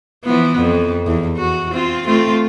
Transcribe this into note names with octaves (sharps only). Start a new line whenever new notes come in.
E3 F3 B3
F2
E2
F#4
C4 F4
A3 C4 F4